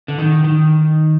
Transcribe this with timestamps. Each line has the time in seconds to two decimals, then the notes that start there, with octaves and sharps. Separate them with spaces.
0.08 D3
0.18 D#3
0.44 D#3